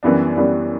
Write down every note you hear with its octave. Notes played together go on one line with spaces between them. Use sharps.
F#2 E3 G3 B3 D4
F#2 E3 G3 B3 D4